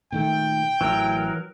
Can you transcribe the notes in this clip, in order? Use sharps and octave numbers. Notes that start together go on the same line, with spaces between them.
A#2 D#3 A3 G5
A1 E3 F#3 A#4